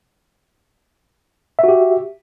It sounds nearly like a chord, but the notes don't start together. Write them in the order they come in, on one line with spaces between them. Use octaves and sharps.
E5 F#4 G4